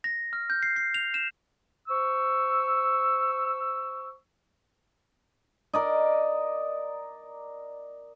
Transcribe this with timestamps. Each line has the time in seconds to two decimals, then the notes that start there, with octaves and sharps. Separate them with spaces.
0.04 A#6
0.33 F6
0.50 G6
0.63 C7
0.76 C7
0.94 F7
1.14 E7
1.88 C5 C#6 E6
5.73 A#4 D5 D#5